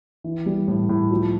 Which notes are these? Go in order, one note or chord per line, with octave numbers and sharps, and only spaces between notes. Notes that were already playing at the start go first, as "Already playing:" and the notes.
E3
G3
A2
A2
F3